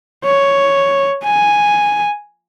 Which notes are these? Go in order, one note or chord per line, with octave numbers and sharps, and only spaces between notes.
C#5
G#5